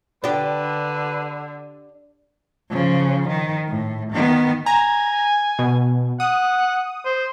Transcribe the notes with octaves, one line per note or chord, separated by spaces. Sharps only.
D3 D4 G4 B4
C#3 F3
D#3
A2
D#3 B3
G#5 A#5
B2
F#5 D#6
C5